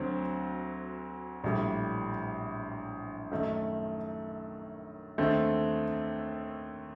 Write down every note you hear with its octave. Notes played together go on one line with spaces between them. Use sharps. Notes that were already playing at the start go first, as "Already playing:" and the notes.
Already playing: D2 D3 F#3 C4
A#1 A2 G3
F#2 D#3 A3
D#2 D3 A3 C4